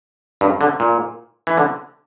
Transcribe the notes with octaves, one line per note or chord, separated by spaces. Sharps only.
G2
D3
A#2
E3
D3